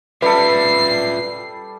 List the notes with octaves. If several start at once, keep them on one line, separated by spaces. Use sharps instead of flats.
G3 F4 A4 B4 D5 E5 C7